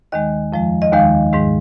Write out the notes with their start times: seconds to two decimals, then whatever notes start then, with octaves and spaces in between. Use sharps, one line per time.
0.12 D#2 D#3 G#3 D#5
0.53 F2 F3 G#3
0.82 D#5
0.93 D#2 D#3 G#3 F5
1.33 G#2 D#3 G#3